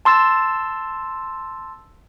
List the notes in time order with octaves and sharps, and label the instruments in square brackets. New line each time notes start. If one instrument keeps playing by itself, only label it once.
[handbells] A5 C6 E6 A6